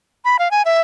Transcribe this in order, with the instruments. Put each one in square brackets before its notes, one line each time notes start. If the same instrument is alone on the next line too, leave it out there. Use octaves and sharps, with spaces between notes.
[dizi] B5
F5
G#5
E5